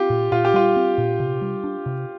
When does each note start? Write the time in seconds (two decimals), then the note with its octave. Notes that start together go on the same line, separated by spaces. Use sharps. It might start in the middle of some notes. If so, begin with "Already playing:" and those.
Already playing: C4 F4 G4
0.10 A#2
0.32 A#2 F4
0.45 G4
0.54 G3 F4
0.76 C4
0.98 A#2
1.20 C3
1.42 G3
1.64 D4
1.86 C3